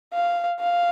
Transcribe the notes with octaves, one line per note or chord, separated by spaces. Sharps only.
F5
F5